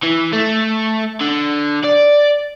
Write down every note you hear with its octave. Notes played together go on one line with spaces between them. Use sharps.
E3
A3
D3
D5